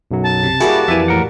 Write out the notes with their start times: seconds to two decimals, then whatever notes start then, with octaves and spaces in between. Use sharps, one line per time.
0.11 B1 F#2 F#3
0.23 A5
0.44 C3
0.60 G3 A#3 E4 F#4 G#4
0.88 F2 E3 E5 G#5
1.08 A2 A#4 F#5